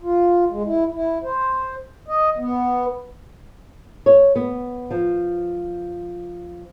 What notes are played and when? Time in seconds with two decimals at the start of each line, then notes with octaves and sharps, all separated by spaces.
0.02 F4
0.50 G#3
0.65 E4
0.94 E4
1.23 C5
2.08 D#5
2.38 B3
4.06 C#5
4.36 B3
4.91 F3